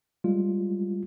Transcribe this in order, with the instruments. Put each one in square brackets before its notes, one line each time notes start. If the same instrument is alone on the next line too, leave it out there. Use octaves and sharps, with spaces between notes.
[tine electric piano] G3 G#3 F4